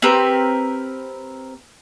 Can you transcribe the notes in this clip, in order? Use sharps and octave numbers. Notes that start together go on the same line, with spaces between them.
C4 G4 A#4 B4